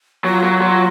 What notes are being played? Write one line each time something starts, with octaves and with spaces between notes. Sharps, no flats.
F#3 F4
F#3
F#3